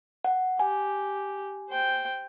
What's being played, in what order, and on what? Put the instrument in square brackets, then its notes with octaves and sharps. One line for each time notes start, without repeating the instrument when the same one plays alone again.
[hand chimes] F#5
[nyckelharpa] G4 [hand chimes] G#5
[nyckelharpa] C5 G5